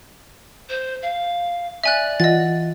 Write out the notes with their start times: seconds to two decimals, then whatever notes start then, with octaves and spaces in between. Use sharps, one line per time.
0.69 C5
1.02 F5
1.84 D5 E5 G#5 F#6
2.20 E3 F4 D#5 F#5 A6